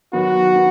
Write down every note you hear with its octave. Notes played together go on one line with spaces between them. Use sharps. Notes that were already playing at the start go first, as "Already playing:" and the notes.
D#3 F#3 B3 F#4
B3